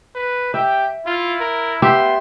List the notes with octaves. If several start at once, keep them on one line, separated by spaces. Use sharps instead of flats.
B4
G4 E5 G5
E4 F4
A#4
B3 G4 E5 C6